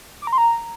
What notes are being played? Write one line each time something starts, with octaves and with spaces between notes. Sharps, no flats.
D6
A#5
C6
A#5